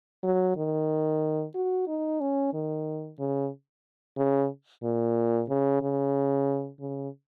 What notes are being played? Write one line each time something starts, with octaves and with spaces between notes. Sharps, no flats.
F#3
D#3
F#4
D#4
C#4
D#3
C#3
C#3
A#2
C#3
C#3
C#3